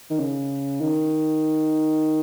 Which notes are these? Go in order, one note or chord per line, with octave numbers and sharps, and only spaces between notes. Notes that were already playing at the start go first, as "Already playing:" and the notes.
D#3
C#3
D#3